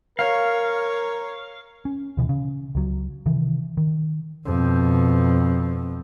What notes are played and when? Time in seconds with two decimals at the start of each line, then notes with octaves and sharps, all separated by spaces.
0.19 A#4 C#5 F5
1.85 C#4
2.17 D2 B2 D3 E3
2.29 C#3
2.75 C#2 F#3
3.26 C3 D#3 E3
3.77 D#3
4.46 F2 B2